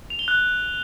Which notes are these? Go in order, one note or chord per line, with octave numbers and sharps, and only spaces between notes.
F7
G7
F#6